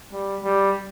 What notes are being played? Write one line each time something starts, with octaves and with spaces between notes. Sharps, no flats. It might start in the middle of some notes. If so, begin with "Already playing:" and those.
G3
G3